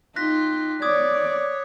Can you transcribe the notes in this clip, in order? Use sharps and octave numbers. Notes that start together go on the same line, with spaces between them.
D#4 F4 G4 F#6 A#6 B6
C#5 D5 D6 D#6 G#6